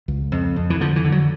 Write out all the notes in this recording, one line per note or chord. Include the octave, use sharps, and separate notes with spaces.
C#2
F2
F2
E3
D3 F3
E3
D3
F#3